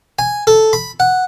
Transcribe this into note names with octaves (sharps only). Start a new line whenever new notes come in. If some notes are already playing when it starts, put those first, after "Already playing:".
G#5
A4
B5
F#5